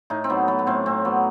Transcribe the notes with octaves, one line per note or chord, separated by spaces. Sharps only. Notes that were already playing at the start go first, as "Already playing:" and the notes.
A2 D#4
C4
F#3 B3
F#3 B3
B3
A2 C4
A2 C4
F#3 B3